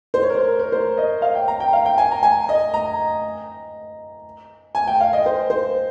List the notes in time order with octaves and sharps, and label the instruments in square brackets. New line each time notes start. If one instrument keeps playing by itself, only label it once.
[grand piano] C5
C#5
A#4
C5
A#4
A#4
C5
D#5
F5
G5
A#5
G5
F5
G5
G#5
A#5
G#5
D#5
A#5
G#5
G5
F5
D#5
C5
C5